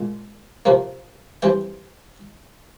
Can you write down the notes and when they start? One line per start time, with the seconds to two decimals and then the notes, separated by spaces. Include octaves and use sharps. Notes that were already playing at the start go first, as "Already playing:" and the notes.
Already playing: A#2 G#3
0.65 C3 F3 A#3
1.42 E3 G3 C4 G5